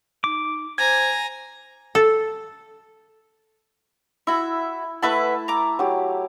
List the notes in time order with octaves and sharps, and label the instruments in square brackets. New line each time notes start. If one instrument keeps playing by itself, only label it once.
[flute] D#4 [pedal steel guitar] D6
[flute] C5 [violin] G#5 A#5 [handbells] G#6
[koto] A4
[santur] E4 [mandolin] F#4 E5
[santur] A3 E4 A5 [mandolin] B4 E5 F#5
[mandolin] A#5 D6
[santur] F#3 G4